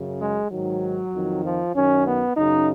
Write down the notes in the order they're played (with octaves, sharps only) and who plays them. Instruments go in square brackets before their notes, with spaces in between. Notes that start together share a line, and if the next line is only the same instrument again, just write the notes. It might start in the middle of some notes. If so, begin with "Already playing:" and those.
Already playing: [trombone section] F#2 C#3
G#3
G#2 D#3 F#3
F2 D#3
F3
F#2 D#3 C#4
B3
F#2 C#3 D#4